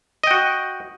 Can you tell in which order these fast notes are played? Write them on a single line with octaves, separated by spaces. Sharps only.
D#5 G5 F#4